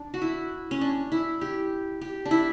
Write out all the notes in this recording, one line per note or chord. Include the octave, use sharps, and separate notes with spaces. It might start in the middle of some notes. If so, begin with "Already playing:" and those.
Already playing: D4
F#4
E4
C#4
D4
E4
G4
G4
D4
E4